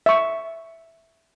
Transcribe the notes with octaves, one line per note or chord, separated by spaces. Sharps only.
E5 C#6